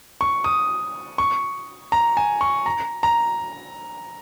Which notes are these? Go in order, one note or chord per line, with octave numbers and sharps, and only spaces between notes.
C#6
D#6
C#6
A#5
G#5
C#6
A#5
A#5